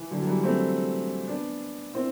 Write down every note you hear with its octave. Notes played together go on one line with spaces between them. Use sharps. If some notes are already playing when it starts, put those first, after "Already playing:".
Already playing: E3
D3 F#3
F#3
E3 G3
A3 C4
B3 D4
C4 E4